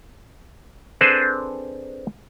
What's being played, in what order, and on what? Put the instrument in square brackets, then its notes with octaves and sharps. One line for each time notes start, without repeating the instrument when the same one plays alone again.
[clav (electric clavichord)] C4 D4 G#4 A4 B4 C5